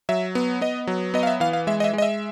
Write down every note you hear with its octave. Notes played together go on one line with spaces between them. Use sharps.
F#3 E5
B3
B3 D#5
F#3
B3 D#5
F5
E5
E3 F5
F5
G#3 E5
D#5
E5
G#3 D#5
E5